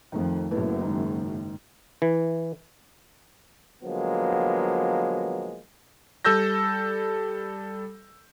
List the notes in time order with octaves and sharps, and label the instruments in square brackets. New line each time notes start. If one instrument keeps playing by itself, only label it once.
[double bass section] F2 [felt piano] D#3 A3
[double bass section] F#1 F#2 [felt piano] A3 B3 E4
[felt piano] G#2 D#3
[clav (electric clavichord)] E3
[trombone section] D3 F3 F#3 G#3 A#3 B3
[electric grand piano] G3 A4 E6 G6 A#6